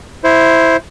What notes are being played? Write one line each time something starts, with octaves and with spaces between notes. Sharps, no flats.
E4 C5